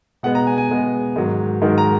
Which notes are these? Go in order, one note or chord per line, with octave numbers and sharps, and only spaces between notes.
B2 G#3 B3 F#5
A#5
G#5
G#5
B2 G#3 B3
G#2 D#3 F#3
G#2 D#3 F#3
A#5